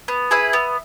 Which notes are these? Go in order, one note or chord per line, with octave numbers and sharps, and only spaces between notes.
B3
E4 G#4 B4
B3